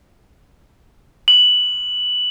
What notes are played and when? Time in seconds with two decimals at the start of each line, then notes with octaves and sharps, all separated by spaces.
1.28 F#7